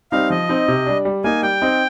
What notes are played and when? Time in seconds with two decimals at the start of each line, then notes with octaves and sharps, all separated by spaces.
0.12 G3 C4 D#4 F5
0.30 F3 D#5
0.49 C4 D#4
0.68 C3
0.86 G3 D4
1.05 G3
1.24 A#3 D#4 G#5
1.42 G3 G5
1.62 C4 D#4